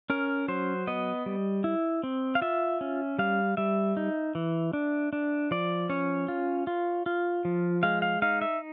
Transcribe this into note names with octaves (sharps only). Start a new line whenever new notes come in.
C#4 A#4
F#3 C5
B3 D#5
G3
E4
C4
F5
F4 E5
C#4
G3 F5
G3 E5
D#4
E3
D4
D4
F3 D5
C#4 C#5
F4
F4
F4
F3
G#3 F5
F5
D#4 F5
E5